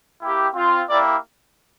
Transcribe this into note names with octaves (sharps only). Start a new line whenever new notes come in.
A#3 E4 G4
C4 F4
A#3 E4 G4 D5